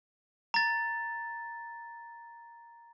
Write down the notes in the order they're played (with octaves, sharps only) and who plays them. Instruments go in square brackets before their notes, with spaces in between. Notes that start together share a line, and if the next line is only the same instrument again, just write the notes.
[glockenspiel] A#5 A6